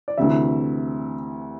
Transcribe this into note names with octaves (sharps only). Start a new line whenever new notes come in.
D5
D2 C3 E3 E5